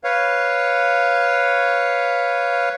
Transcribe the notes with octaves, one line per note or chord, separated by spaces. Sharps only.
B4 C#5 F5